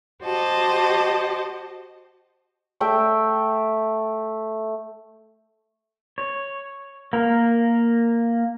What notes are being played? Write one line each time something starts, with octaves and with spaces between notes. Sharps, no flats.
F#4 G4 C5 D#5 A5
A3 E5 G5
C#5
A#3 A#4